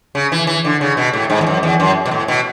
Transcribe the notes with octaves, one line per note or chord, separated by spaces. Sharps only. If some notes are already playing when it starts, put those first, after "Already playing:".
C#3
E3
E3
D3
C#3
B2
A2
G#2
E2
F#2
E2
F#2
B2
A2
B2